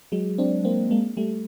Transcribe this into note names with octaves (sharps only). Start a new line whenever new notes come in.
F#3 G#3
C4 D4
A#3 C4
G#3 A#3
G3 A3